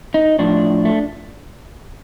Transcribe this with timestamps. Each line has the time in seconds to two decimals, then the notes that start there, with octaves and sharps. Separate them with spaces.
0.14 D#4
0.39 A2 F3 D4
0.85 A3